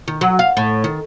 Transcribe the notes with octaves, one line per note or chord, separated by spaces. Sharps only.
D#3
F#3
F5
A2
D#3